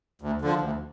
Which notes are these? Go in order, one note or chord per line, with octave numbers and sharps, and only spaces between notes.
D2
D3 F3
D2